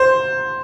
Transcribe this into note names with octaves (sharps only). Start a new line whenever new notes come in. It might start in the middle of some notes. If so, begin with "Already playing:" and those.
Already playing: C5